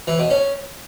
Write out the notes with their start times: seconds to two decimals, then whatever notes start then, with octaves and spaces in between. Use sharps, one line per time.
0.07 E3
0.19 B2
0.30 C#4